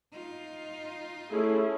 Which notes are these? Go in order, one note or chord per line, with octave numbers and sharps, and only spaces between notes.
D#4 F4
A3 C#4 E4 G#4